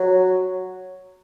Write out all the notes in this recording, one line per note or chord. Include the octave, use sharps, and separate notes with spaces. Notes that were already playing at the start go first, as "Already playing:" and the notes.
Already playing: F#3